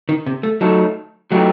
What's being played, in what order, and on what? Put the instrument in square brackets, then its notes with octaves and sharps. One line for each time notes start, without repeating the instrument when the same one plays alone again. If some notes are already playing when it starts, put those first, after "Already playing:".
[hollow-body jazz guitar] D#3
C3
A3
[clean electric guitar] D2 D3 A3 D#4 A4 [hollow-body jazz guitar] F#3
[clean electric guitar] A2 A3 D#4 G4 [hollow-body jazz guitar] F#3